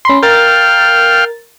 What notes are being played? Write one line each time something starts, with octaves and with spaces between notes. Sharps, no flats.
C#4 B5 C6
A#4 F5 G5 F6 A6